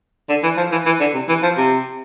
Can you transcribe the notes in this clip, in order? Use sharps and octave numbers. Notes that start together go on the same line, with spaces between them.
D3
E3
F3
E3
E3
D3
C3
E3
F3
C3